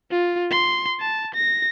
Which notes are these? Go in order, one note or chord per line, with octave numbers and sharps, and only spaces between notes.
F4
C6
A5
A#6